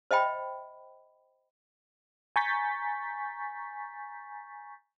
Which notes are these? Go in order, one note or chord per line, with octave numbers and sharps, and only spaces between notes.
C5 D#5 E5 G5 B5
G#5 A#5 C#6 G6 A6 B6